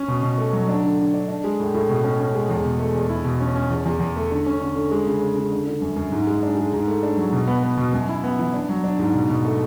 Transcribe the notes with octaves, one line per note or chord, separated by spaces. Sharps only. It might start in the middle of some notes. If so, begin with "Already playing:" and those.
Already playing: C#4
B2
B2
A3
F#3
D4
D3
D3
D4
D4
G#3
A2
A2
B2
C#4
C#4
G#3
E2
B2
A3
E2
E4
B2
C#4
C#4
E2
E2
E2
A3
D3
C#4
D3
D3
G#3
C#3
C#3
C#3
D3
D3
F#2
F#2
G#2
G#3
D4
G#3
G#2
A3
D4
F#3
B2
B3
B3
B2
F#2
E4
B3
E3
D4
F#3
D4
G#2
B2
B2
A3